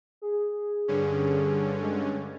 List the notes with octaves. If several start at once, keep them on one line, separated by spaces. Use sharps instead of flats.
G#4
G2 D3 C#4
G#3